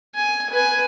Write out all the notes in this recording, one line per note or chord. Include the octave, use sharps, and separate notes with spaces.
G#5
B4 G#5